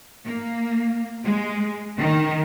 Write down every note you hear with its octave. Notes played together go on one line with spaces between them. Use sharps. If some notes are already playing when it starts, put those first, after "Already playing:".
A#3
G#3
D#3